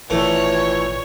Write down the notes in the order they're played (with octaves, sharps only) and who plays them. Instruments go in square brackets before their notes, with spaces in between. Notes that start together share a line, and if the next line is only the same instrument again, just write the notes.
[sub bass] G#1 [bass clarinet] A#2 [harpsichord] E3 A3 [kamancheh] C#5